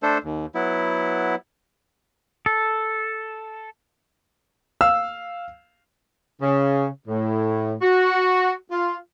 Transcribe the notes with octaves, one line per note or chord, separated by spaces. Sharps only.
A3 D4 A4 C5
D#2
F#3 B3 E4
A4
F5 E6
C#3
A2
F#4
F4